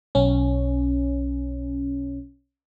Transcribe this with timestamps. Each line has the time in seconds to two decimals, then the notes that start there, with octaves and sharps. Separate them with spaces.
0.15 B1 C#4